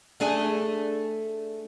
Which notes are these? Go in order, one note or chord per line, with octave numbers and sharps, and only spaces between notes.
A3 D4 G#4